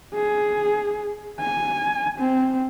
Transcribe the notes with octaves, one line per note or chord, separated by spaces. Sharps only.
G#4
G#5
C4